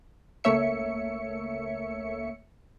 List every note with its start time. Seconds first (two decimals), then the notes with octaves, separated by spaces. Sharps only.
0.44 C#2 A3 A#3 C#5 E5 C#7